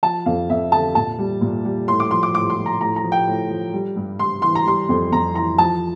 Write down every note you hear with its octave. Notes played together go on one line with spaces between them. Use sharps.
F3 A5
F2 F5
F2 E5
D3 A5
A#2 A5
G3
A#2
G3
A2 C6
D6
F3 C6
D6
A2 D6
C6
F3
A#5
A2 A#5
A#5
F3
G5
A2
F3
G3
G2
G2 C6
E3 C6
A#5
G3 C6
F2
F2 A#5
E3 A#5
F3 A5